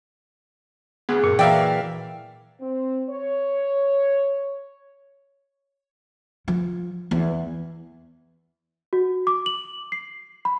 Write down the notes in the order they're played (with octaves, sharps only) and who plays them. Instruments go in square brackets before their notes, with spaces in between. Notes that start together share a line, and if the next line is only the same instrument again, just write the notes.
[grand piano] D2 [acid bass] B3 [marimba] G#4
[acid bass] F#2 [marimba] A#2
[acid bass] E3 [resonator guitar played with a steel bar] F#3 A#3 G5 [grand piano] D5 E5 F5
[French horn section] C4
C#5
[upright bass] F3
E2
[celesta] F#4
D6
F#7
C7
B5